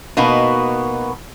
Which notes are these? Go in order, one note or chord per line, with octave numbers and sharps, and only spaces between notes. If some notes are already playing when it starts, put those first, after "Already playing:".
B2 A#3 B3 D#4 F#4